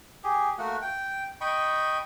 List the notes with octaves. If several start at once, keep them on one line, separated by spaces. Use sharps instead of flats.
G4 G#4
A3 A#3 F#4
G5
D#5 G5 B5 C#6